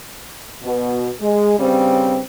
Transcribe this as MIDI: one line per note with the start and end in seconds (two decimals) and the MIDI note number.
0.63 1.10 47
1.20 1.54 56
1.58 2.19 43
1.58 2.19 49
1.58 2.19 55
1.58 2.19 60